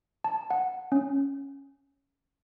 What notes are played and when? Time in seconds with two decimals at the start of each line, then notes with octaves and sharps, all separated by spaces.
0.24 A5
0.51 F#5
0.92 C#4